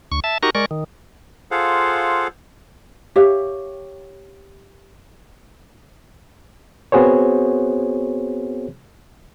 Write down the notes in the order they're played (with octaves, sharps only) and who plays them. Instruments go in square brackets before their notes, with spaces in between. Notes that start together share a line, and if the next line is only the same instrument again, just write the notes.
[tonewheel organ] D2 C#6
E5 A5
D#4 F#4 G4 A#4 A#5 C#6
G#3 A#4 D5 C#6
D#3
[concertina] F4 G#4 A4 C5 F5 F#5
[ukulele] G4 C#5 E5 F5
[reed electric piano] B3 C4 F#4 G#4 C5 C#5